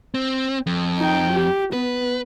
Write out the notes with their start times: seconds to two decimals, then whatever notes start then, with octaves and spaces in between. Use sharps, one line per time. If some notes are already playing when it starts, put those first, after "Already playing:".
0.14 C4
0.67 F2
0.98 D#4 G5
1.33 G4
1.73 B3 B4